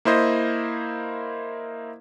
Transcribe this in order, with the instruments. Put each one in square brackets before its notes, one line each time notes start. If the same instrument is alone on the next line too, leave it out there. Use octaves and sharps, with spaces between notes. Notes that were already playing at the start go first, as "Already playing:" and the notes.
[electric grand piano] A#3 E4 C5 D#5